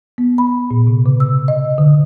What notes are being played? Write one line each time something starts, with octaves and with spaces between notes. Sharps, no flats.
B3
B5
A#2
C3
C#3
E6
D#5
D3